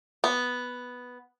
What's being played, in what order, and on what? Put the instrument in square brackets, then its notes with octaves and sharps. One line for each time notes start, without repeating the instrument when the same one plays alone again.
[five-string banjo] B3